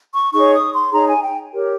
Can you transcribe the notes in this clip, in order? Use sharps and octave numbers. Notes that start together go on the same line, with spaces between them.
C#6
D#4 G#4 C#5 C#6
D#6
C6
D#4 G#4 C#5 A#5
G#5
G5
G4 A#4 C#5